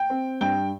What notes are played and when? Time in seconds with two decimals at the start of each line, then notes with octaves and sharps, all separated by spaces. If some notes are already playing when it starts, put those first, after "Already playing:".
Already playing: G5
0.10 C4
0.41 G2 G5